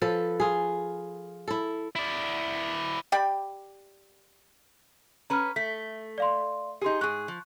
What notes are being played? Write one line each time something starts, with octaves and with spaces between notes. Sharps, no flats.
F3 A4 B4
F4 G#4
E4 A4
E4 D5
G4 D5 G5 B5
C#4 B4 A#5 F6
A3 B6
D5 F5 C6
D#4 G4 G#4 C6
G#2 G#4 C#6 F#6
F3